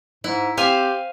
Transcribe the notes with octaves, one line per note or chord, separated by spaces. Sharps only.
G#2 E4
C4 G4 C5 F5 G#5